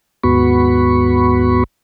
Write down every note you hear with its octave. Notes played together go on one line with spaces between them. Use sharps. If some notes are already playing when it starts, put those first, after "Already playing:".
D#2 G#2 B3 F#4 B5 C#6